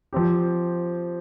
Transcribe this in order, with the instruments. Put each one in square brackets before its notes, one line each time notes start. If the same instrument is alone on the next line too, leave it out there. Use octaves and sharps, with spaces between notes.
[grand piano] F3 C4 G4